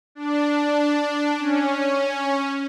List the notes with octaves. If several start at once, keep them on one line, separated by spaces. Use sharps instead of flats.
D4
C#4